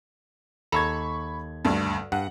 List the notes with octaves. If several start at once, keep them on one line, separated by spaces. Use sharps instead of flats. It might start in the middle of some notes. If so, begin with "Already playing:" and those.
D#2 A4 A#5 B5 C#6 G#6
D2 G2
G2 F#5